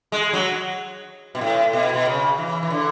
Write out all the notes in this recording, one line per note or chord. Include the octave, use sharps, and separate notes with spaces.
G#3
F#3
B2
A2
B2
B2
C#3
E3
E3
D3